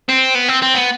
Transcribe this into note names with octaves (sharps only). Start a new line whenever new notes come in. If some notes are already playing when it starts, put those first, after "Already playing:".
C4
B3
C4
C4
B3